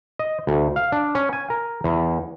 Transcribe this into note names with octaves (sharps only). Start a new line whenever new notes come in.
D#5
D2
F5
D4
C#4
G#5
A#4
E2